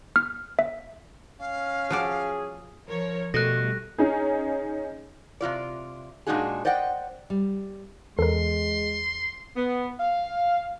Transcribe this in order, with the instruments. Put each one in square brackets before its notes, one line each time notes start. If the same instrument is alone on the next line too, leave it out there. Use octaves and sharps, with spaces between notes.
[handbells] F6
E5
[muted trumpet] C#4 [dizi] F5
[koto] F3 F#4 D5 [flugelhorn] G#4
[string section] F3 A#4 C#5
[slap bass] B2 [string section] G3 A3 [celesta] A4 [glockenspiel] F#6 A#6
[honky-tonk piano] C#4 D#4 G#4
[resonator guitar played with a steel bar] C3 E3 F4 D5
A#2 G#3 D4 D#4 F#4 G#4
C5 D5 D#5 F#5 G5
[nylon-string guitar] G3
[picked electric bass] E2 [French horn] G#3 [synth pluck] A4 A#4 [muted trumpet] C6
[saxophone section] B3
F5